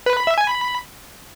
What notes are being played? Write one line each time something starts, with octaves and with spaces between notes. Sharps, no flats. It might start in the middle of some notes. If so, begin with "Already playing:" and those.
B4
B5
E5
G#5
B5